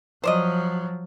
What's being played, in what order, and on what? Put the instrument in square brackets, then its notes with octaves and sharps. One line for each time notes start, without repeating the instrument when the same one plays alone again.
[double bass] F3 F#3 [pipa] C5 D5 D#5